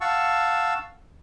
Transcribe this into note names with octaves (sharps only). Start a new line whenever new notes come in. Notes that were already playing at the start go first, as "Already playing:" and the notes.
F5 F#5 A5 C#6 E6